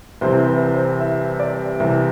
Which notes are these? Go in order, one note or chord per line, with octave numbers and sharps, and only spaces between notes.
C2 C3 E3 C5
B4
C5
E5
D5
C2 C3 E3